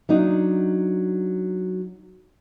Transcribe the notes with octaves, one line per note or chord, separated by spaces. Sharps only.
F#3 D4 D#4